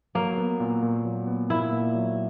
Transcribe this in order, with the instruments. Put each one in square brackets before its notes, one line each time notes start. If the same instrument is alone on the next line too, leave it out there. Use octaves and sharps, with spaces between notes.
[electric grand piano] F#3 [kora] A#3
[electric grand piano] B3
A#2
A#2
F#3
B3
[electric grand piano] A#2 [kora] E4
[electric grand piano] A#2
F#3